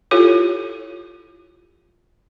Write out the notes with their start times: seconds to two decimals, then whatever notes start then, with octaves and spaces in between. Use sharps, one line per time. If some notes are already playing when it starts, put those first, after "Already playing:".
0.11 E4 F4 G4 A4 C#5